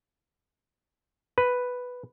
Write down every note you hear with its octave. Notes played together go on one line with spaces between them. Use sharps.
B4